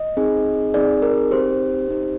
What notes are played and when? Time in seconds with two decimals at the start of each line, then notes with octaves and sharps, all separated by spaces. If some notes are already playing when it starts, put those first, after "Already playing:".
Already playing: D#5
0.17 C4 D#4 G#4
0.74 C4 D#4 G#4 D5
1.02 A#4
1.31 C4 D#4 G4 C5
1.88 C4 D#4 G4